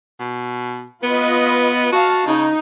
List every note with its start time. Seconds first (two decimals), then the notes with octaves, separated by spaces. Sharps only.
0.20 B2
1.03 B3 F4 B4 D#5
1.92 F#4 F5 A5
2.27 C#3 D#4